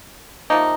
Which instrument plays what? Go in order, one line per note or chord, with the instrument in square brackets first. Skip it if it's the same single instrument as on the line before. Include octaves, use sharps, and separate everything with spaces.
[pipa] C3 F3 A#3 D#4